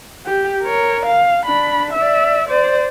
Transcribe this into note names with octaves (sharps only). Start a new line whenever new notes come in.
G4
A#4 C#5
F5
D4 B5
D5 E5
C5 D5